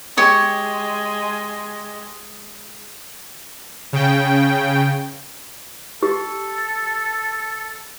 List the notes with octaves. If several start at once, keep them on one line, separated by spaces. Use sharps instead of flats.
G#3 G4 C#5 D#6
C#3 G5
G4 A4